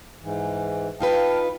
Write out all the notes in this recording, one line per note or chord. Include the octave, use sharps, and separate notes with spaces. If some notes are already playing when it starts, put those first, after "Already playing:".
G#2 E3
D#4 F4 B4 F5 G5 A5